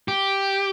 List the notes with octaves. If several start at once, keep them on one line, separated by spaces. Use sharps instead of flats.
G4